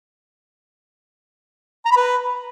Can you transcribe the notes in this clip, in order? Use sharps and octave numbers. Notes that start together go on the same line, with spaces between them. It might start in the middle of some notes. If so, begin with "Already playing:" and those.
A#5
B5
B4